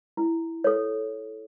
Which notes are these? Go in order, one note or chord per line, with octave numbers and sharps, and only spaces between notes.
E4
A4 C#5